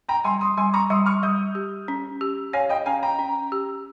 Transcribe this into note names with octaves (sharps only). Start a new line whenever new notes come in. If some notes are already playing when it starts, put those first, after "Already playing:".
G5 A#5
G3 G#5 C6
C6 D#6
G3 G#5 C6
A#5 C#6
G3 C6 D#6
C#6 F6
G3 D#6 G6
G4
C#4
G4
C#5 F5 G#5
D#5 G5
C#4 F5 G#5
G5 A#5
C#4
G4